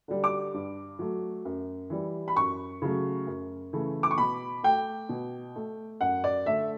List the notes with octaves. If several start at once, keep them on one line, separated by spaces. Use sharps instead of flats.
D3 G3
D6
G2
F#3 A3
F#2
E3 G3
B5
F#2 C#6
C#3 F#3 A3
F#2
C#3 E3 A3
D6
C#6
B2 B5
A3 G5
B2
A3
F#2 F#5
D5
D3 A3 E5